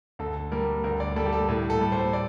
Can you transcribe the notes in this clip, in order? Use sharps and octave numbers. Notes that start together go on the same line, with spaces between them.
D2 A4
G3 A#4
D2 A#4
D5
G3 A4
G4
A4
A2 A4
A4
G3
C5
D5